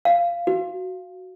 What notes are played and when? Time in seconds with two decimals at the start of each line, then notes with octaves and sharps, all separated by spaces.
0.05 F5
0.47 F#4